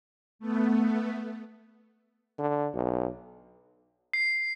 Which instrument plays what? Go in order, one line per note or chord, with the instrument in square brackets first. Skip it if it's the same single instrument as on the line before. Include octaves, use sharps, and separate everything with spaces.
[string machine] A3 B3
[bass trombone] D3
B1
[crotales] C7